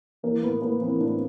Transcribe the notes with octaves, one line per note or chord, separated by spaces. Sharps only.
E3 A#3
A2 B3
A2 A#3
E3 C4
A2 D4